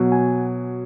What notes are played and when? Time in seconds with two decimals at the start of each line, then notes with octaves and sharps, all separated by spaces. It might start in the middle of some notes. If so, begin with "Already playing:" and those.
Already playing: B2 F#3
0.12 G#5